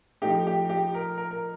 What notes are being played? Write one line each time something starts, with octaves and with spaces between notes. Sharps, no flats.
F3 A3 D#4 G4
G4
G4
A#4
A#4
A#4